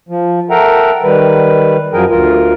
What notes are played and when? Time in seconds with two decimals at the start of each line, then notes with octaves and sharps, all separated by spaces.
0.09 F3
0.50 A4 A#4 E5 F#5 G5 A#5
1.03 D#3 G3 B4
1.93 F#2 F3 F#3 G#4 A#4 G5
2.10 D2 F4 A#4